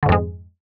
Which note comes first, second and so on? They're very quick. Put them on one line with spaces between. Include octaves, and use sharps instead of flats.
D3 G#2 F2 G#3